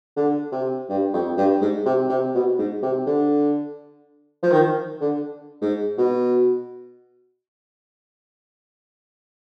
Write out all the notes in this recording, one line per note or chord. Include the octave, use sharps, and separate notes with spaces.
D3
C3
G2
F2
G2
G#2
C3
C3
B2
G#2
C3
D3
F3
D#3
D3
G#2
B2